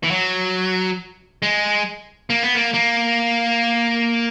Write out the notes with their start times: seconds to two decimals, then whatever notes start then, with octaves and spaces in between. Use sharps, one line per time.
0.03 E3
0.11 F#3
1.42 G#3
2.30 A#3
2.43 B3
2.55 A#3
2.74 A#3